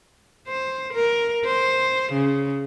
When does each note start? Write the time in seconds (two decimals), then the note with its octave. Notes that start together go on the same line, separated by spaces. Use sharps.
0.48 C5
0.94 A#4
1.46 C5
2.13 C#3